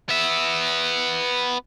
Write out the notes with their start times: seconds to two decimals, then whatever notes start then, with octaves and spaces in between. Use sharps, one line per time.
0.09 B3 E5